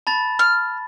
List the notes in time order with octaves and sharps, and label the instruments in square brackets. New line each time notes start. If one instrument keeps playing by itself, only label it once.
[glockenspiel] A5 B5 A6
[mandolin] F6